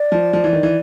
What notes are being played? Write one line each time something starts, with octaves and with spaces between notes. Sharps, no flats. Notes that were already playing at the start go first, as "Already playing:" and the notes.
Already playing: D5
F3
F3
E3
D#3
E3